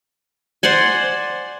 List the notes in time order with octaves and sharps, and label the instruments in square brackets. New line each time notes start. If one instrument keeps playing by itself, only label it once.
[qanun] C5 D5 F#5 G#5